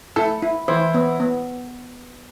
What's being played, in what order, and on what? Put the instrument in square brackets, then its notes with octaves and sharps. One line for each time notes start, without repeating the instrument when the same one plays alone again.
[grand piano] A3 A4 [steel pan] E4
[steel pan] E4
[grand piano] E3 E4 [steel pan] C5
[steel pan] B3
B3